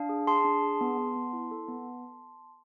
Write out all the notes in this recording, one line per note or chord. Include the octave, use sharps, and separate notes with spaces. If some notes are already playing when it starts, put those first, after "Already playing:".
Already playing: D4 F5
G#4
G#4 A5 C6
D4
G#4
B3
B3
B3
E4
A4
B3